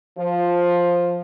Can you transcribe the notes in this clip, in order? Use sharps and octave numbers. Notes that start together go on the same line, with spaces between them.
F3